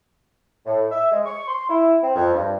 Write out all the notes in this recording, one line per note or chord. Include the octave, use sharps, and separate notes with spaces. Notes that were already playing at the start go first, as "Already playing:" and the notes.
A2
E5
G#3
C#6
C6
E4
C4
F2
G2